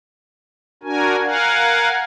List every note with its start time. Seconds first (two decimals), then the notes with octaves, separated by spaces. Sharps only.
0.83 D4 F#4 A#4 G#5
1.23 A#4 F5 F#5 G#5